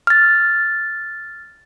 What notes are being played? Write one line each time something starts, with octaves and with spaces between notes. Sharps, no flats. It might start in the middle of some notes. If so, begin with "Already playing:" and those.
F6 A6